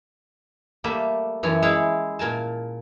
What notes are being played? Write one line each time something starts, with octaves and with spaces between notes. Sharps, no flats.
G3 A3 A#3 E5
F#2 E3 C#5 G#5 A5
G#3 E4 G#4 C#5 F5
A#2 A#4 G#5 A5